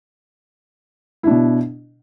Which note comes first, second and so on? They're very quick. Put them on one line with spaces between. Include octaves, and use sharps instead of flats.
E4 D4 B2